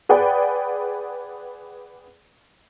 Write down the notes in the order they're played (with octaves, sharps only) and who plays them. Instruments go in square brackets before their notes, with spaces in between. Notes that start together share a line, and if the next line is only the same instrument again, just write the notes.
[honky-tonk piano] G#4 B4 D5 F#5 G5